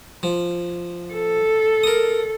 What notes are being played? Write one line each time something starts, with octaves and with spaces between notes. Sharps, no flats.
F3
A4
A#4 D#6